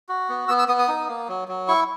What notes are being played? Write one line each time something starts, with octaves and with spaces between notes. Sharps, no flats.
F#4
B3
B3 E6
E6
B3 D#6
D#6
D#4
A#3
F#3
F#3
E4 C#6